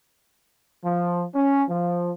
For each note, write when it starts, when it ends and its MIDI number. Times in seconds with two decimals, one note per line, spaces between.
0.84 1.23 53
1.35 1.62 61
1.70 2.12 53